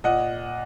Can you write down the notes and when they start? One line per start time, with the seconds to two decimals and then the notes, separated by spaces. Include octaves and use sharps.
0.04 A#2 D#5 F#5